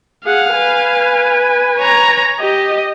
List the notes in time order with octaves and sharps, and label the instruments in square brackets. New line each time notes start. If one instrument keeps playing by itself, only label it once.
[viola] G#4 F#5 [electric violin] F5
[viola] B4 G#5
[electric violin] C#5 A#5
[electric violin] G4 [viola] D#5